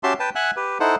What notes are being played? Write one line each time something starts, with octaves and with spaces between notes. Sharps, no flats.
C#4 F#4 G4 E5 A5 C6
B4 G5 A5
E5 F#5 G#5 F#6
G4 B4
D#4 E4 A4 C5 F#5